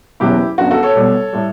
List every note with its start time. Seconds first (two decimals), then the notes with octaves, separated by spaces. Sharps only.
0.20 F#1 E2 B2 F#3 E4 G4
0.58 G1 F#2 D3 F#4
0.71 F#4 A4
0.83 A4 C#5
0.95 B1 B2 G3
1.33 A2 G3